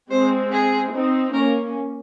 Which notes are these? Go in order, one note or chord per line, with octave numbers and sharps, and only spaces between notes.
G#3 C4 C5
G#4
C4 D#4
A#3 C#4 A#4